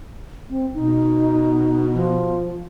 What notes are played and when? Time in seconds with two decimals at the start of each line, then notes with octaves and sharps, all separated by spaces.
0.50 C4
0.74 B2 D#4
1.94 F3